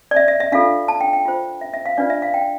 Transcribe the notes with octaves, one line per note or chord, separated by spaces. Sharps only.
D5
E5
E5
E5
D4 F4 A4 F5
A5
G5
G5
F4 C5
E5
E5
F5
D4 F4 B4 D5
E5
F5
G5